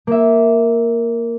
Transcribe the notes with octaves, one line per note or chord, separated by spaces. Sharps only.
A#3 E5